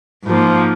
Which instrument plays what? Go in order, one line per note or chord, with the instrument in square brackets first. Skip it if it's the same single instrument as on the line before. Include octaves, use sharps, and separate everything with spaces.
[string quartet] G#2 F3 A#3